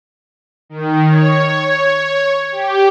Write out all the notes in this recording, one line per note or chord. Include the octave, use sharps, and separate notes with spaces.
D#3
C#5
G4